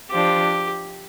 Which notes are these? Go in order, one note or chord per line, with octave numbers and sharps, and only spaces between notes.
F3 D4 F4 G4 C5